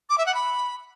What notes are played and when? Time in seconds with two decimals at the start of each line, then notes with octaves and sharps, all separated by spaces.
0.10 D6
0.18 E5
0.26 F#5
0.35 B5